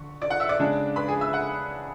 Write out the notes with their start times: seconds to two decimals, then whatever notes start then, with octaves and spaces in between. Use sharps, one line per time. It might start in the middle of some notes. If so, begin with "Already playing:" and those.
Already playing: D3 C#6
0.22 D5 D6
0.30 F#5 F#6
0.40 E5 E6
0.49 D5 D6
0.59 C#3 G#3 D4
0.96 B4 B5
1.08 G#4 G#5
1.21 E5 E6
1.33 F#5 F#6